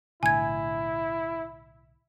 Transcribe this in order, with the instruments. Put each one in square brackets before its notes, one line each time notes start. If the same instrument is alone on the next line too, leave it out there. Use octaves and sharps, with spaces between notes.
[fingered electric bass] B1 A2 D3 [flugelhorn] E4 [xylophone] G#5 G#6